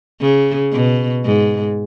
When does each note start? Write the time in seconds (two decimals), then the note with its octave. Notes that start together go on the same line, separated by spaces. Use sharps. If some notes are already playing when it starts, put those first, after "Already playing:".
0.21 C#3
0.73 B2
1.25 G#2